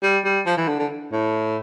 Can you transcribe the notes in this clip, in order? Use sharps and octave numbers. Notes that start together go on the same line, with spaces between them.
G3
G3
F3
E3
D3
D3
A2